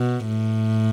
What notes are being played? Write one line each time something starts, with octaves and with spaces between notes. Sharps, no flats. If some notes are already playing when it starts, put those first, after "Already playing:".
Already playing: B2
A2